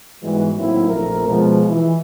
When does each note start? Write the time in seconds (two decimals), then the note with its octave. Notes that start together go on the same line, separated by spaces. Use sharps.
0.23 G#2 E3 G3 G#3 B3 F#4
0.58 A2 D#3 F#3 A#3 C4 E4
0.88 A#1 F2 A3 A#4
1.27 B2 F3 G#3
1.68 E3